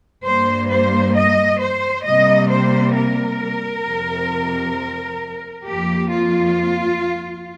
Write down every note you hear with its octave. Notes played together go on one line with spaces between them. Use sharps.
G2 G3 A#3 C5
C5
D#5
C5
C3 G3 A#3 D#5
C5
A#4
F2 C3 F3
F2 F3 A#3 G4
F4